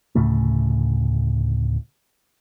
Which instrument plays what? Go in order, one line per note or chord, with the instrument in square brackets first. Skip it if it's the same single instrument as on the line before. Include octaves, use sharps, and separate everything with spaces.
[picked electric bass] D2 A2 C#3 A3